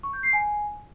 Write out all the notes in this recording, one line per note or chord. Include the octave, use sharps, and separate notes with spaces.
C#6
G6
C7
G#5